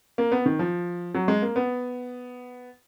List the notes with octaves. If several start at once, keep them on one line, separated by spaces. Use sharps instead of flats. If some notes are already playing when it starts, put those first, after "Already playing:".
A#3
B3
D#3
F3
F#3
G#3
A#3
B3